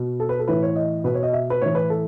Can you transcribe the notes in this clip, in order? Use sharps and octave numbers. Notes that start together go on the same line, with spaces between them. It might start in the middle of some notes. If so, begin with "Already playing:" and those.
Already playing: B2
A4
B4
A4
A2 E3 B4
C#5
D#5
B2 B4
C#5
D#5
E5
B4
A2 E3 C#5
B4
A4